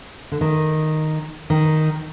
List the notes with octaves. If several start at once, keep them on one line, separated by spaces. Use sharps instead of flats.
D3
D#3
D#3